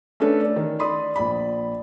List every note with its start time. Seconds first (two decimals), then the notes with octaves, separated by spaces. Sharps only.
0.20 A3 C#4 D4 A4 B4
0.41 D5
0.56 D#3
0.79 D5 B5 C6 D#6
1.16 A#1 D5 B5